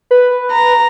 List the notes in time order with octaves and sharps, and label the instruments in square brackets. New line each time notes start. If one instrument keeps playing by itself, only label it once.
[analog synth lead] B4
[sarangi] A#5